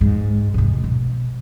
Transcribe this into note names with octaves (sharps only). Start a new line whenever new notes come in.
G#2
E2 C3
B2